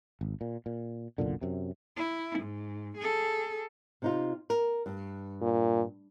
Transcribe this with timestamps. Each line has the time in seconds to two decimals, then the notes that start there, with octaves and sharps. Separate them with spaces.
0.21 G#1
0.41 A#2
0.66 A#2
1.18 F#1 B1 A#2 D3
1.41 F#2 C3
1.96 E4
2.39 G#2
2.97 G#4 A4
4.02 C3 D#4 F4
4.50 A#4
4.86 G2
5.42 A#2